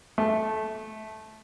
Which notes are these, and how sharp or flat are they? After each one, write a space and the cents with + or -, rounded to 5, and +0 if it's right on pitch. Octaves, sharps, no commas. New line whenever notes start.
A3 -20